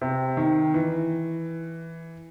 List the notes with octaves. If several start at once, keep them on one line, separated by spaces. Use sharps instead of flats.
C3
D#3
E3